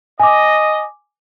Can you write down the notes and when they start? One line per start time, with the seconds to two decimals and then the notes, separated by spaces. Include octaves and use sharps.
0.20 D#5 G#5 D6